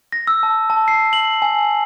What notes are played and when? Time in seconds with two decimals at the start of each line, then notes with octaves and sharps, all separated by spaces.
0.12 A#6
0.27 E6
0.43 A5
0.70 A5
0.88 C7
1.13 F#7
1.42 G#5